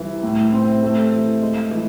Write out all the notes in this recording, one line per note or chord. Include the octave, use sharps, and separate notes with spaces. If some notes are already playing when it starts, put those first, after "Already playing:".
Already playing: C2 E3
A2
C4
A3
E3
G#3
E3